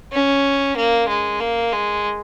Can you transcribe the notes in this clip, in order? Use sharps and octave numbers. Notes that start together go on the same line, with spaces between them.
C#4
A#3
G#3
A#3
G#3